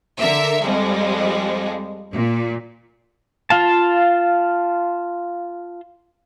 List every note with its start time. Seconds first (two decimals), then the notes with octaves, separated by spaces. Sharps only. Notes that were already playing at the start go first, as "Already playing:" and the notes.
0.19 D3 A#4 E5
0.62 F2 G3 G#3
2.14 A#2
3.50 F4 F5 A5